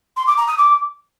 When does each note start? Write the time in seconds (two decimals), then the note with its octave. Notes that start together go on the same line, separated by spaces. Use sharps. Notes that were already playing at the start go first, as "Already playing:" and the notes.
0.16 C6
0.27 D6
0.37 A#5
0.48 D#6
0.58 D6